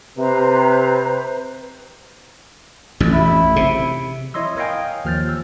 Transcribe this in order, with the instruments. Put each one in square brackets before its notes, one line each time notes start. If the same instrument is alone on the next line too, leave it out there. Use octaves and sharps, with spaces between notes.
[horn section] C3 [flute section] B4 C5 A#5
[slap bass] A1 F2
[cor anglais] E4
[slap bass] C3
[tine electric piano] E4 C#5 D#5 C6 E6
A#4 C#5 D#5 F5 G5 G#5
D#2 F3 F6 G6 A6
E6